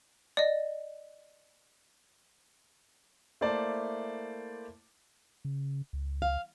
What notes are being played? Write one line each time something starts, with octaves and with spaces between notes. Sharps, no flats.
D5 D#5
A3 A#3 E4 C5 D5 A5
C#3
C#2
F5